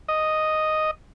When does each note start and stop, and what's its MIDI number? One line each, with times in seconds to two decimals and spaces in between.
0.08 0.91 75